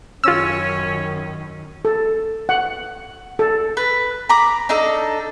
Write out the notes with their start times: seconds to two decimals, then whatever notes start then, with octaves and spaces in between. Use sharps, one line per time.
0.24 F#2 D#3 C#4 F4 E6
1.85 A4
2.49 F#5
3.39 A4
3.77 B4
4.29 A#5 B5 D6
4.69 D4 D#4 A4 A#5